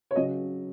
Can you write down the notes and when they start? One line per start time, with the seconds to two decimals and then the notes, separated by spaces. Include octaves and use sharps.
0.11 C#5
0.16 C#3 F#3 D#5